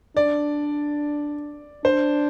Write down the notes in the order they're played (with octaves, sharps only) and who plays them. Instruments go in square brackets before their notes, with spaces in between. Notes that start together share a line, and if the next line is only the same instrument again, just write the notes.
[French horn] D4 [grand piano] D5
[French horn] D4 [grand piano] C5